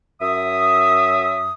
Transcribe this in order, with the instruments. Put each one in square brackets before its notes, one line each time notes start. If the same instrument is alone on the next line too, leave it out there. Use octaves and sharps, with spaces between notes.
[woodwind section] F#2 E5 D#6